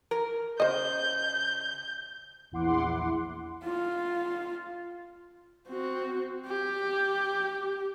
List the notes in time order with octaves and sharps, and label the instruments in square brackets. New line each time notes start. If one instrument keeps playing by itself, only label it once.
[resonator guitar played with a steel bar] A#4
[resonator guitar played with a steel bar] C#3 [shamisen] C5 D#5 [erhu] G6
[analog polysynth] A#1 E2 E4 F#5 C6 D6
[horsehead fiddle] F4
C4 F#4
G4